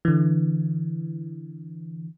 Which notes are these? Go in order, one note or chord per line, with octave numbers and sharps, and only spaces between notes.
D3 E3